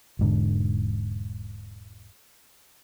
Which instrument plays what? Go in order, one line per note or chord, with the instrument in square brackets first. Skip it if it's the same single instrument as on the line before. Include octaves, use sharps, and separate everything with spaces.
[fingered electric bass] E1 G#2 D3